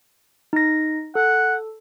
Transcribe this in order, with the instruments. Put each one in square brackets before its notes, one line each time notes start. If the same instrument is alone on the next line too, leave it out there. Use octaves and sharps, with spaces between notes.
[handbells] D#4 A#6
[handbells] A4 [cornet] F#5